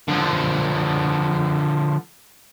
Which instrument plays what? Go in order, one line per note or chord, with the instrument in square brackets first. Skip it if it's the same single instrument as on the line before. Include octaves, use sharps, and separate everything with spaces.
[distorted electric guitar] D3 F3